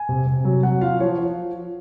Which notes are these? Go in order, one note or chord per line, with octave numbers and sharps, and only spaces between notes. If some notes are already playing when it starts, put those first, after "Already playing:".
Already playing: G#5
C3
C3
F#3
F#3 F#5
F4 F5
F3 C#5
F3